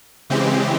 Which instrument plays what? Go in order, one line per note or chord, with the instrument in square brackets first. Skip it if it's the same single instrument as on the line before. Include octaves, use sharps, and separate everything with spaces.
[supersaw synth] C#3 E3 G#3 C4 G4